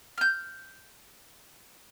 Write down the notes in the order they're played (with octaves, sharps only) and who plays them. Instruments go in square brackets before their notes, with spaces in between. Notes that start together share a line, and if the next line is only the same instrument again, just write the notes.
[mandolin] F6 G6